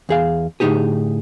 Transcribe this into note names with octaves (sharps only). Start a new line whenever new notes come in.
E2 G#4 F5
A2 D3 B3 D#4 G4 G#4